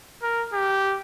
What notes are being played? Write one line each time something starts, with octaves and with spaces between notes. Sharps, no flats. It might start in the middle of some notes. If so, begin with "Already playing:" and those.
A#4
G4